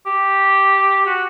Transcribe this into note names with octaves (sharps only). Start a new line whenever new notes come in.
G4
F#4